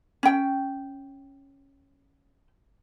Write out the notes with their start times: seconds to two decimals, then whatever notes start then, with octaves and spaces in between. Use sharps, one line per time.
0.23 C#4 G5